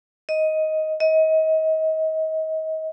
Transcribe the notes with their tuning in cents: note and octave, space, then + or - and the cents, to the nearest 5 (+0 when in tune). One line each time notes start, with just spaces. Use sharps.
D#5 +10
D#5 +30